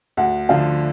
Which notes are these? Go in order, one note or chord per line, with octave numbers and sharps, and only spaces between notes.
D2 F#5
D3 F3 A3 F5